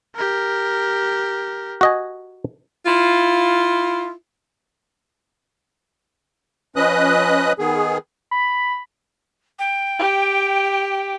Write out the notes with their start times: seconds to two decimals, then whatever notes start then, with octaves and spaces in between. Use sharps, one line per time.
0.15 G4 A#4
1.81 F#4 D#5 G#5
2.86 E4 F4
6.76 F3 C#4 B4 D#5 D#6 F#6
7.59 D#3 B3 G#4
8.31 B5
9.59 G5
9.99 G4